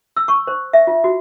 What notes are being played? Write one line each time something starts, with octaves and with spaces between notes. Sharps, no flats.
E6
C#6
C5
E5
F4
F#4